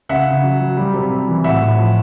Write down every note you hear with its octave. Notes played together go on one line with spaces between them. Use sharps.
C#3 E5 F#5
C#3
F#3
F#3
G3
C3
C3
E3
A2 E5 F#5
A2
F3